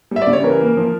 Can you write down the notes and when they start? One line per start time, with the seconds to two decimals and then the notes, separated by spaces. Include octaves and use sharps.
0.11 G3 E5
0.22 D5
0.27 C#3
0.33 C#5
0.44 E3 A#4
0.60 A#3
0.77 F3